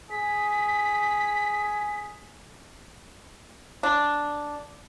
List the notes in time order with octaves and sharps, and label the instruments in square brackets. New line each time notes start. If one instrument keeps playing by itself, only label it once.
[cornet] G#4 [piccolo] B6
[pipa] D4